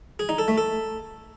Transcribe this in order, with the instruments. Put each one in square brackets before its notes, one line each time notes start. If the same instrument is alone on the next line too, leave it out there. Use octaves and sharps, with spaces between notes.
[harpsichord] G#4
D#4
A4
A3
A4